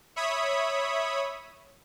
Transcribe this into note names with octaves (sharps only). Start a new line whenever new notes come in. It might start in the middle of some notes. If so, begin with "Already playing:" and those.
C#5 E5 B5 D#6